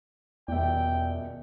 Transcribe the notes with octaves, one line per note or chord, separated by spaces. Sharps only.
D#1 E2 B2 D5 E5 G5